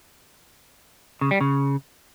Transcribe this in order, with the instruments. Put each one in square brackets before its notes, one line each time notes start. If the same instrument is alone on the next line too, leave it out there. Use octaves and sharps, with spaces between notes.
[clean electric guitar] C#3
G3
C#3